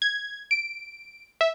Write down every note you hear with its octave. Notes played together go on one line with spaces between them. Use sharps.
G#6
D7
E5